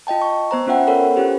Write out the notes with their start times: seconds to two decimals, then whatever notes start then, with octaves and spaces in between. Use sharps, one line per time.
0.07 F4 D#5 G5 A5
0.22 C#6
0.51 B3 C5 A#5
0.67 B3 C#4 F4 E5 F#5 G5
0.87 A4 A#4 C#5 F#5 B5
1.16 C#4 F4 G4 C5